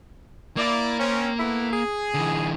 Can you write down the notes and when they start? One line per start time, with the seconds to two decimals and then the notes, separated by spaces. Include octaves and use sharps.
0.57 A#3 E4 D5
0.99 C4 C#4
1.39 A3 B3 E4
1.71 G#4
2.14 D3 E3